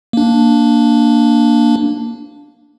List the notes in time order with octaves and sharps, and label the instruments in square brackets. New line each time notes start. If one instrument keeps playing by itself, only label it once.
[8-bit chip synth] A#3 D4